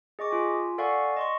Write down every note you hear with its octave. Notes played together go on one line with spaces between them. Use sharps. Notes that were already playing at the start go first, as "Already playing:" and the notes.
G#4 D#5 C#6 D6
F4 G#5
A4 D5 F5 F#5 G#5 C#6
D#5 C6 C#6